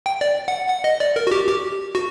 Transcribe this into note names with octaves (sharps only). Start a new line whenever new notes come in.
G5
D5
F#5
F#5
D#5
D5
A#4
F#4
G4
G4
F#4